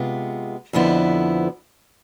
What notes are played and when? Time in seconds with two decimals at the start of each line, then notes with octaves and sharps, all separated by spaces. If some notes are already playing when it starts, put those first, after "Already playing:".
Already playing: C3 G#3 B3 F4
0.73 F2 D3 F3 B3 E4